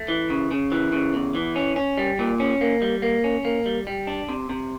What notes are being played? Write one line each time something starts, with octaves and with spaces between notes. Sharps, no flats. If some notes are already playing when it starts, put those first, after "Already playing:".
Already playing: A3
E3
C#3
C#3
E3
C#3
E2
E3
C#4
C#4
G3
A#2
C#4
A#3
G3
A#3
C#4
A#3
G3
G3
D4
C3
C3